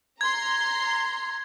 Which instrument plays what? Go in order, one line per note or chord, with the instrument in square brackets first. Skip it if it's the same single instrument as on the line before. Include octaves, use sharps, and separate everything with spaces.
[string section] A#5 C6 [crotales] G#6